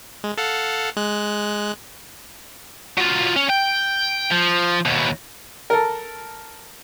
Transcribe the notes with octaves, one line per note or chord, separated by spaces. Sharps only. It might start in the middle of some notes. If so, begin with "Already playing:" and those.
G#3
A4 F5 F#5
G#3 F#6
F#3 F4
C#4
G5
F3
D#2 B2
A4 A#4